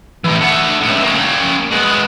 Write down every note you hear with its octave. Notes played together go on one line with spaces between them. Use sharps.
A2 E3
A3 F#5
C#2 A2
A#3 C#4
G#3 B3